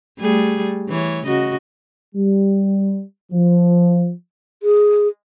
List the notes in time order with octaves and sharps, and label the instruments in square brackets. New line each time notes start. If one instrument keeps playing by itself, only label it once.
[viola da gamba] G3 A3 G#4
E3 C#5
C#3 F#4 D#5
[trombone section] G3
F3
[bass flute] G#4